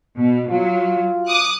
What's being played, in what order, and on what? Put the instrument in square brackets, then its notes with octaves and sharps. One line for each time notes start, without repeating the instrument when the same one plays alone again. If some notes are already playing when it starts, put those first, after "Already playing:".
[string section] B2
[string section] F#3 [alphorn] F4
[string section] D6 D#6 F#6